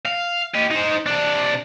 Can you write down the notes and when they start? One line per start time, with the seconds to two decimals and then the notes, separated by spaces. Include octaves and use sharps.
0.05 F5
0.55 G4 D#5
0.71 D#4 C5
1.06 C3 D4